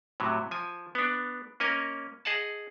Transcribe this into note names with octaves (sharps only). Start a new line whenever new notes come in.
A2 C3 F#3
F3 G#5
B3 D4
A#3 C#4 A#4 D#5 G#5
G#4 D#5 F#5 A5